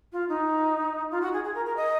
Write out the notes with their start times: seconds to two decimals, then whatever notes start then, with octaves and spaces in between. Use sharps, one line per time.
0.12 F4
0.29 D#4
1.11 F4
1.22 F#4
1.33 G#4
1.44 G#4
1.55 A#4
1.66 A#4
1.77 D#5